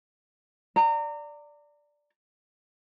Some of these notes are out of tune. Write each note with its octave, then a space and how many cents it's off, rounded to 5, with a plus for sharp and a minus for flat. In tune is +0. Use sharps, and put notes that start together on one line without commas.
D5 +0 A#5 -30